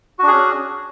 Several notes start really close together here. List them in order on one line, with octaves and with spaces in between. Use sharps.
F#4 D4 G#4 C#4